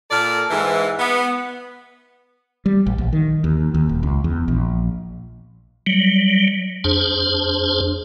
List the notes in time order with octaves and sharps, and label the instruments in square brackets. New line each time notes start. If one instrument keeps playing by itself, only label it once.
[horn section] A#2 A4 A#4 D5
G#2 E3
B3
[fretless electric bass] G3
A1
A#1
D#3
D#2
D#2
D#1
C#2
E2
A#1
[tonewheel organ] F#3 G3
F2 D4 G#4 C5